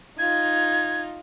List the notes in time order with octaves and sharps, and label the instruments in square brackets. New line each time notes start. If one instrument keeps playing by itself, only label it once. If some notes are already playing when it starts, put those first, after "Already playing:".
[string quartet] D#4 F4 [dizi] G#6